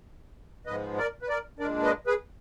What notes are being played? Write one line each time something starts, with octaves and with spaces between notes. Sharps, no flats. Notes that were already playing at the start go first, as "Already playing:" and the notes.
G#2 F3 G#3 B3 B4 D#5
A#4 D5
B4
A#4 D5
A#2 G#3 D4 A#4 D5
B4 D#5
G#4 B4